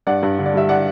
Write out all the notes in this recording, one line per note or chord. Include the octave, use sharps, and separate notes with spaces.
G2 D5 F#5
G2
D3
D5
G3 E5
D5 F#5